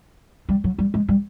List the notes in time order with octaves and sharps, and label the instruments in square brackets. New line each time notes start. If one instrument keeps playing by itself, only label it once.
[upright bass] G3
F#3
G3
G#3
G3